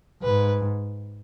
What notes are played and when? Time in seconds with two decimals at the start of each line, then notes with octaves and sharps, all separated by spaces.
0.23 G#2 B4